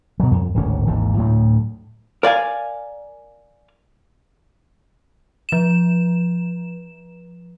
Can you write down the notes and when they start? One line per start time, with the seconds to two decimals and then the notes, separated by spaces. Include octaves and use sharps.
0.20 B2 F#3
0.31 F2
0.55 D1 G#1 D2 C#4
0.87 G#1 D#2 G#2 E3
1.17 D2 A2 F#3
2.23 A#4 D5 F5 G#5
5.49 F3 E7